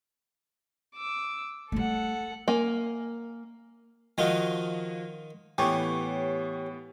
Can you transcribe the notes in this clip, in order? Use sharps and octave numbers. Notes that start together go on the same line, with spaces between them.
D6 E6
G3 A3 A4 F#5
A#3 G#5
D#3 F3 D#4 F4 F#4
A2 E3 B3 G4 C#5